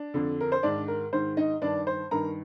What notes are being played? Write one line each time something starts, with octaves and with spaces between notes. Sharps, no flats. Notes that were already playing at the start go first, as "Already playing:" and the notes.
Already playing: D4
F2 D3
A#4
C5
G#2 D#3 D4 D5
A#4
G#2 D#3 C5
D#4 D#5
G2 D#3 D4 D5
C5
G2 D#3 A#4 A#5